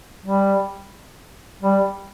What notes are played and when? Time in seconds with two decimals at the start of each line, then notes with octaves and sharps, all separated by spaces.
0.24 G3
1.62 G3